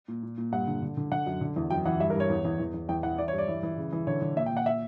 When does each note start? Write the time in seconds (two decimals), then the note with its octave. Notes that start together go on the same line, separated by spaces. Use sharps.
0.08 A#2
0.23 A#2
0.38 A#2
0.52 G2 F#5
0.67 D3
0.82 D3
0.97 D3
1.12 D3 F#5
1.26 F#2
1.41 D3
1.56 E2
1.70 F#2 G5
1.86 E3 F#5
2.00 G2 E5
2.10 A#4
2.15 G2 C#5
2.30 E2
2.45 E2
2.60 E2
2.74 E2
2.89 E2 G5
3.03 E3 F#5
3.18 E3 D5
3.28 C#5
3.33 G2
3.38 D5
3.48 E3
3.63 E3
3.77 C#3
3.92 E3
4.07 D3 C#5
4.22 D3
4.36 A#2 E5
4.46 G5
4.51 A#2
4.57 F#5
4.66 E5